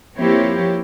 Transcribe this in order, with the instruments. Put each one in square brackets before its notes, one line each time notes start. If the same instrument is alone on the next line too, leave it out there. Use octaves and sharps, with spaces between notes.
[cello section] F3 A#3 C4 E4 G4 C#5